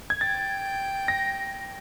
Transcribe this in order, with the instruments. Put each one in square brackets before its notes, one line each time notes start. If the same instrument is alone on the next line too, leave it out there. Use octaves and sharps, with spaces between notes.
[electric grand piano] G#6
[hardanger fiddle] G5 [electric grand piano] A6
[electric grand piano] A#6